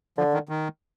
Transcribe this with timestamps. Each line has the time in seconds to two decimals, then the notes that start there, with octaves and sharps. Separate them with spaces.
0.17 D3 F3
0.34 D#3
0.49 D#3